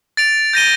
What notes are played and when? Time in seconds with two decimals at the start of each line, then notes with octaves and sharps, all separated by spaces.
0.17 A6 D7 F7
0.53 G6 A#6 D#7 G7